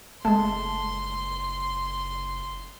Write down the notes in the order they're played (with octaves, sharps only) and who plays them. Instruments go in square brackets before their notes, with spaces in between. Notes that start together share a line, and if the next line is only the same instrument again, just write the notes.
[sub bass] F#1 [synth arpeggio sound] G#3 A3 [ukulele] A5 [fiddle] C6